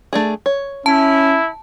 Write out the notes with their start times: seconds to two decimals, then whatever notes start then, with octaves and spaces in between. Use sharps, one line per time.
0.13 A3 D4 G#4
0.46 C#5
0.86 C#4 E4 A5